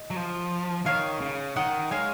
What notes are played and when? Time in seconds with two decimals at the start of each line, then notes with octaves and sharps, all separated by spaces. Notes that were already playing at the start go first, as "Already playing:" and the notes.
Already playing: D#5
0.10 F#3
0.16 F3
0.86 D#3 C#5 F5
1.21 C#3
1.56 D#3 D#5 F#5
1.91 G#3 C#5 F5